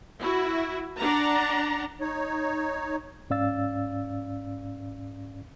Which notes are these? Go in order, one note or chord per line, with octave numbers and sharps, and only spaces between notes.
E4 F#4
D4 D5 F#5 A#5
D#4 C#5
G#2 C#4 D5 F5 E6 A6